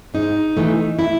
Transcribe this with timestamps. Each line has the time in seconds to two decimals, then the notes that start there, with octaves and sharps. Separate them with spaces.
0.14 G#2 D#4
0.57 E3 A3
0.99 E4